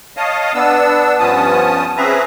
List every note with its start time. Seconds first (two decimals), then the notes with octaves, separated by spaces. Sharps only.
0.17 C#5 D#5 F5 A5 D#6
0.54 B3 D4 E6
1.19 G2 F3 B3 C#4 A5 D#6
1.97 C4 C#4 G#4 B4 E5 A#5